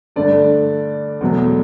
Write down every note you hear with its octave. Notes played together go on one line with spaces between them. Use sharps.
G2 D3 A3 D5
E2 B2 F#3 A3